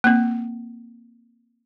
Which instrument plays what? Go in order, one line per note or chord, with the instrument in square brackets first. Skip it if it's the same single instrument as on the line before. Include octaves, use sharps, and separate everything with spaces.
[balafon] A#3 C4